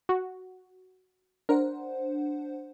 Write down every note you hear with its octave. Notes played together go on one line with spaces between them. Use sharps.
F#4
D4 A#4 C5 F#5